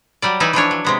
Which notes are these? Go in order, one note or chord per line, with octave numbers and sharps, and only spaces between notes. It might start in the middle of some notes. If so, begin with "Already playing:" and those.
F#3 G3 D5
E3 D#4 B4 D5 E5 G#5
E3 F3 D4 C#5
F#3
C3 G#3 B3